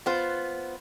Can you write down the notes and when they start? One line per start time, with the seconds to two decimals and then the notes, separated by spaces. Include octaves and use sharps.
0.06 B3 F4 C5